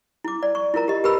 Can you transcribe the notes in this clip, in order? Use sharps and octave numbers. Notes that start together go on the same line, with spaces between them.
E4 D6
D5
C#6
E4 F4 A#4 A#5
G4 D#5
G4 A#4 B4 B5 E6